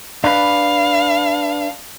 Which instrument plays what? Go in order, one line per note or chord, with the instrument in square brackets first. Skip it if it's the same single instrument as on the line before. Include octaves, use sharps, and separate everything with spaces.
[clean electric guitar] D4 B4 [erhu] F5